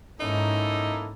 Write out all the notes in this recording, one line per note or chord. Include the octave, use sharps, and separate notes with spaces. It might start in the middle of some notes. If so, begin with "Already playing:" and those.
G#2 A#3 C#4 D#4 E4 A4